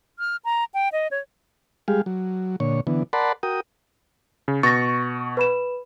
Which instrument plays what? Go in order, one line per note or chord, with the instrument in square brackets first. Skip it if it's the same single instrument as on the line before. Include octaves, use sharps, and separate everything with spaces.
[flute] F6
A#5
G5
D#5
C#5
[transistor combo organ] G3 G#3 G4 G#4 F5
F#3
A#2 D3 C#5
D3 E3 B3
A#4 D5 F#5 A5 B5 C6
F#4 A#4 G5 D#6
[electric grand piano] C#3
[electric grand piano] B2 C#6 [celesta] A6 A#6
[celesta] B4 B5 E7